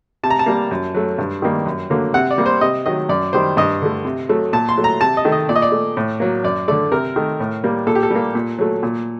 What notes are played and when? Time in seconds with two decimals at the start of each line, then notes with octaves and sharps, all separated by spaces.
0.23 C3 A5
0.30 A#5
0.39 A5
0.46 G3 A#3
0.71 F#2
0.95 F#3 A3
1.18 G2
1.42 D#3 G3 A#3
1.66 F#2
1.90 D3 F#3 A#3
2.14 C3 F#5
2.31 D5
2.38 G3 A#3
2.46 C5
2.61 C3 D#5
2.86 D#3 F#3 D#5
3.09 F#2 D5
3.33 D#3 G3 C5
3.57 G2 D#5
3.82 D3 A3
4.05 C3
4.29 F#3 A3
4.53 A#2 A5
4.69 C6
4.77 F#3 A3
4.84 A#5
5.01 C3 A5
5.17 D#5
5.25 D#3 A3
5.32 D#5
5.49 A#2 D5
5.56 D#5
5.62 D5
5.72 A3
5.97 A2
6.20 F#3 A#3
6.44 F#2 D5
6.68 D3 A3 D5
6.91 C3 A#4
7.16 D#3 A3
7.40 A2
7.64 G3 A#3
7.87 A#2 A4
7.95 G4
8.03 A4
8.11 G3 A#3
8.35 A#2
8.58 F#3 A3
8.83 A#2